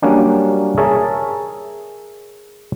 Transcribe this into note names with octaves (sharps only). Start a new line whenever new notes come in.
F#3 G3 A#3 C#4 D4
G#4 A#4 C#5 E5 A5